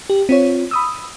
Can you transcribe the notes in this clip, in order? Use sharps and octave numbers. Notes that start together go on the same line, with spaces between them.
G4
C4 F4 C#5
B5 D#6 E6